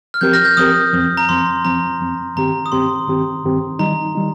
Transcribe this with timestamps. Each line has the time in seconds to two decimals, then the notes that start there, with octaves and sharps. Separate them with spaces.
0.14 F6
0.21 F3 C4 G4 A#4 G6
0.33 F6 A#6
0.45 G6
0.57 F3 C4 G4 A#4 D#6
0.93 F2 F3 C4
1.17 A#5
1.29 F2 F3 C4 C6
1.65 F2 F3 C4 A#5
2.00 F2 F3 C4
2.36 G2 D#3 C4 G4 A#5
2.66 D#6
2.72 G2 D#3 C4 G4 C6
3.08 G2 D#3 C4 G4
3.44 G2 D#3 C4 G4
3.79 D#3 G3 D#4 A#5
4.15 D#3 G3 D#4